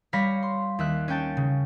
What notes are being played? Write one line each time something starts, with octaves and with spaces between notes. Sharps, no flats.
G3 C#5 F5 B5 A#6 B6
C6
D#2 E5 F#6
C#4 C#5 G5 A5
C#3